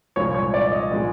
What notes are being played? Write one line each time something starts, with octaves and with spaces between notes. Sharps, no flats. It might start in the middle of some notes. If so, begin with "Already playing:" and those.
C2 A#2 F3 G#3 C#5
C#5
D5
D#5
A#2 F3 G#3